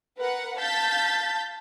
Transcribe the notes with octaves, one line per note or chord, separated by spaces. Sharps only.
A#4 B4 F#5
F5 A5 G6 A6 B6